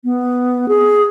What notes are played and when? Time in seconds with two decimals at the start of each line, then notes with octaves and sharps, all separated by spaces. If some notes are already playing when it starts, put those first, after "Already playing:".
0.04 B3
0.68 G#4